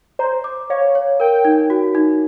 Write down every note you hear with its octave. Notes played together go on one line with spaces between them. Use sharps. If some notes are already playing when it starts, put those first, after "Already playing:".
C5 A#5
D6
C#5 F5
C#5
A#4 G5
D#4
F#4
D#4